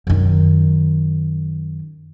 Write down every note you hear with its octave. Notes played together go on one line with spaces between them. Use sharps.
F#2 D#3